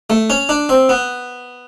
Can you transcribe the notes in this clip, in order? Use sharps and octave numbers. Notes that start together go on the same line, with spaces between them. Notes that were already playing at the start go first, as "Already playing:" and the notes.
A3
C#4
D4
C4
B3